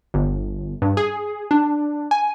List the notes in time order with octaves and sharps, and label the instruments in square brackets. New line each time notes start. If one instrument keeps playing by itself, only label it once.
[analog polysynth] G1
G2
G#4
D4
G#5